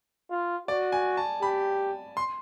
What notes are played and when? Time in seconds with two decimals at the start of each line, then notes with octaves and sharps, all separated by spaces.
0.31 F4
0.68 F#4 D5
0.92 G#5
1.17 A5
1.42 G4 B5
2.17 C6